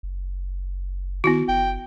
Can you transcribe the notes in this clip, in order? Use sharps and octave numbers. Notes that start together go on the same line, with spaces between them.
F#1
D#3 B3 E4 F#4
F#1 G5